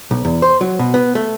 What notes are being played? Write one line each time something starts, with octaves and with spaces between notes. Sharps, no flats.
B1
E2
C5
F#3
B2
B3
A3